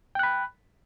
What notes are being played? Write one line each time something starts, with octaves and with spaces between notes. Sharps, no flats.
G5 B5 F#6